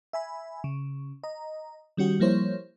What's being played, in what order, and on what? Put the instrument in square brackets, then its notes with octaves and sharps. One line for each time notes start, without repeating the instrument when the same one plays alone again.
[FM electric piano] E5 G#5 B5
C#3
D#5 A#5
D#3 G3 C#4 F#4 G4
F3 G3 A#3 E4 C5 C#5